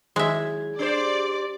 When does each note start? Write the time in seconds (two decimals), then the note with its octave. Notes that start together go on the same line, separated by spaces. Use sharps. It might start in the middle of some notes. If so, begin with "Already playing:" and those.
0.16 D#3 F#3 G#3 G#4 E5
0.79 D4 G4 C5 D5